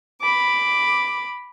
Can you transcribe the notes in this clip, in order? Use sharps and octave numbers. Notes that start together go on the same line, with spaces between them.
B5 D6